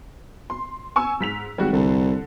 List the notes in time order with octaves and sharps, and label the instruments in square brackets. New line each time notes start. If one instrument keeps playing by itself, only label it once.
[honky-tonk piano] C6
G#5 C#6 E6
G#2 B6 F7
[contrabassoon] G#1 [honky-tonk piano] G3 G#3 F#4
[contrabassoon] C2 [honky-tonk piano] D3